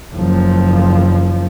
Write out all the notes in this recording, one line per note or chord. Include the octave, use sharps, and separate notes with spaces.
F#1 F3